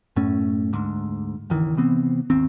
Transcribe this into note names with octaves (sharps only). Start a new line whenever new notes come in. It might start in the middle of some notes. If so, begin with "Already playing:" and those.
F#2 A2 A3 C#4
D2 G#2
G1 C#2 D#3 E3
C3 E3 B3 C4
G#1 D#2 C4